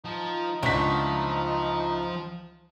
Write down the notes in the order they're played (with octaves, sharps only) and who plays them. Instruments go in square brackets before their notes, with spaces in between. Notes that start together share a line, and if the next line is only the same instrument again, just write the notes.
[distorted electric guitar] F3 [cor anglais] D#4
[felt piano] C#2 B6 [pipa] D3 E3 A3 [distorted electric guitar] F3